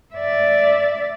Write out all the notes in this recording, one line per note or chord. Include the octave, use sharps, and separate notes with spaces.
D5 E5